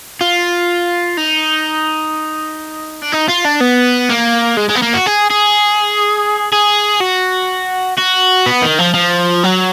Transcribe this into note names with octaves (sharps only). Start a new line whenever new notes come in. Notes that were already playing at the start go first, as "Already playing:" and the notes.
F4
D#4
D4
D#4
F4
D4
B3
A#3
G#3
G#3
B3
A#3
F#4
G#4
G#4
G#4
F#4
F#4
B3
D#3
F3
F3
F#3